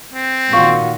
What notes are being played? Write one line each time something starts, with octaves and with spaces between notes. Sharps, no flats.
C4
A#2 D#3 F#4 F5 C6 C#6